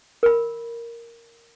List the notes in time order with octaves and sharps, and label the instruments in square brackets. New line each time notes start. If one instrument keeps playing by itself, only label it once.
[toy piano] A#4 B5